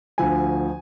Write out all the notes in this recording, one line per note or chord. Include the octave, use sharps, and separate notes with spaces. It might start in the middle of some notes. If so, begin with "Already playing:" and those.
D2 D3 F3 G#5